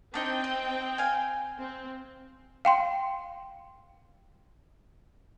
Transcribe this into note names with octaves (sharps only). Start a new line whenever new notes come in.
C4 D4 D#4 D#5 G5
D#5
F5 G#5
C4
F5 G5 C6